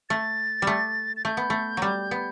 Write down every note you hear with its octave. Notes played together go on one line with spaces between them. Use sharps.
A3 A6
G3 A3
A6
A3 G6
B3
A3
F#3 G3
B3